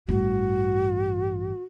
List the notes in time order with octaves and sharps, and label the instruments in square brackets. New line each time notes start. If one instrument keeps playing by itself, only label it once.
[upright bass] A1 G2 [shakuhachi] F#4